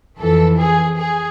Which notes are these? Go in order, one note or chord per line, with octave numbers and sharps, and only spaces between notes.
F2 E3 A4
G#4
G#4